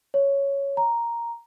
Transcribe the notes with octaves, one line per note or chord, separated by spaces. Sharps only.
C#5
A#5